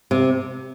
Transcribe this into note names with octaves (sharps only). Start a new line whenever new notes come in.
C3